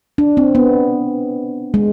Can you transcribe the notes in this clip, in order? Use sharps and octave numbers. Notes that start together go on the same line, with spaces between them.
D4
C4
B3
G#3